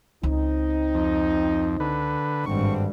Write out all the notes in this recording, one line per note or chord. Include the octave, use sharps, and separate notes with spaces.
C#2 C4 D#4
F2
D3 B4
G#1 G2 D3 C4 D4 C#6